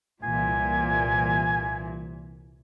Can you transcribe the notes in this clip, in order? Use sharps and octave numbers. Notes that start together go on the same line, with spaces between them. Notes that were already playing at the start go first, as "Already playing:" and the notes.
C2 A#2 E3 G#5